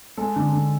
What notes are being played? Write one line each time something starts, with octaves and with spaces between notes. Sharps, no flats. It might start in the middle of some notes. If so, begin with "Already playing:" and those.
G#3 A4
D3
D3